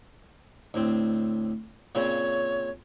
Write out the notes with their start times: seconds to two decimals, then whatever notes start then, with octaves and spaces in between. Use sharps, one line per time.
0.74 D2 A2 C4
1.95 A#2 C#3 C4 C#5